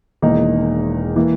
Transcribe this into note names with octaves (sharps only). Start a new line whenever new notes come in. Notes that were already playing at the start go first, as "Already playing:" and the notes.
E1 E2 D#3 A#3 D#4
E3 A#3